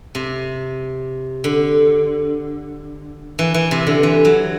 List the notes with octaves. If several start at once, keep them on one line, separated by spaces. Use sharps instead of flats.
C3
D3
E3
E3
C3
D3
E3
F#3